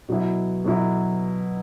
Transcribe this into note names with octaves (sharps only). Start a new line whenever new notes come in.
B2 F#3 E4
B2 F#3 E4